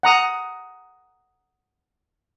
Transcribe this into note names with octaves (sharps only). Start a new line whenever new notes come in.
F#5 A#5 D#6